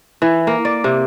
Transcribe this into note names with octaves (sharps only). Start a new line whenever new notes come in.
E3
A#3
D5
C3